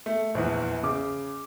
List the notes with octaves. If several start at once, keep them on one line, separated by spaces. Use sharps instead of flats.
A3
A#1 E2
C#3 D6